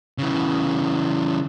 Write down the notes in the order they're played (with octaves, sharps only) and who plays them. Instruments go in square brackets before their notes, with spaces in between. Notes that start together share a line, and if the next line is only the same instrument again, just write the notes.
[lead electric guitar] C#3 E3